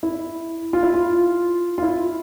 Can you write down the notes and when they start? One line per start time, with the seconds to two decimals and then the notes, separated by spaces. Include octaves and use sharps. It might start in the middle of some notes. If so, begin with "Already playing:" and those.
0.03 E4
0.73 F4
0.83 E4
0.94 F4
1.78 F4
1.83 E4